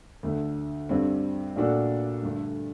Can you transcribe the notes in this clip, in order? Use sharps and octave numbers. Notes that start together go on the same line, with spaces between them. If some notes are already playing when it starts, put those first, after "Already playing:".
D2 D3 A3
G2 D3 G3 C4
A#2 A3 D4 F#4 A4
G2 D3 A3